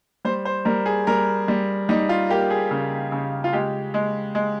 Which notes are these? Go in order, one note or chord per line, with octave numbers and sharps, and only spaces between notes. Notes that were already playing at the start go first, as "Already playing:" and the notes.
G3 C5
C5
G3 A#4
G#4
G3 A#4
G3
G3 D#4
F4
A#3 G4
G#4
C#3
C#3
F4
G#3 G4
G#3
G#3